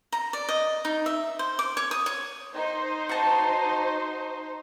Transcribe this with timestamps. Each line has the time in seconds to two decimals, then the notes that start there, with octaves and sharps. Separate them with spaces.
0.12 A#5
0.33 D5
0.49 D#5
0.85 D#4
1.06 E5
1.39 C5
1.59 D6
1.77 C#5
1.91 D#6
2.06 C#5
2.55 D#4 C5
3.09 F#4 A5